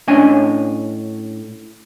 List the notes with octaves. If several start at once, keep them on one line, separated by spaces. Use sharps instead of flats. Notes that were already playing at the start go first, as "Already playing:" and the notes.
A2 C#4 D4 C#5 D#5 G#5